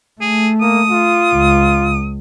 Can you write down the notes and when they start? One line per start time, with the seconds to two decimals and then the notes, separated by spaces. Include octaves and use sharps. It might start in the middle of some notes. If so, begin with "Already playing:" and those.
0.21 A3 G#4
0.61 A#3 D#6
0.90 F4
1.34 C#2